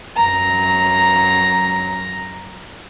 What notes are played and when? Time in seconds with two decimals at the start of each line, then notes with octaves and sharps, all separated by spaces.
0.16 F#2 A#5